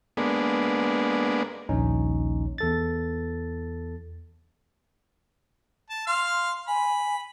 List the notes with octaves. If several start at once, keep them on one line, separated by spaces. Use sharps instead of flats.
G#3 A#3 B3 D4
A#1 D#2 C#4 D#4
E2 A4 A6
A5
F5 C6 F6
G#5 B5